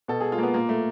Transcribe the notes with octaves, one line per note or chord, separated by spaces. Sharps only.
B2 A4
G#4
F4
A#3
B3
A#2 A#3
A3